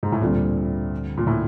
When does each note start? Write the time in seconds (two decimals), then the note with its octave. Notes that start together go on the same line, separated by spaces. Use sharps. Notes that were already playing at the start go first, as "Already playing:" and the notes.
0.03 G#2
0.12 A2
0.21 D2 A#2 D3 G3 C4
1.17 A#2
1.27 A2